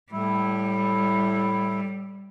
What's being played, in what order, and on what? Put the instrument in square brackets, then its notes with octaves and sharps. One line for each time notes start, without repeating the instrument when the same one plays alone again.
[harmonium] A2 E4 [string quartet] G3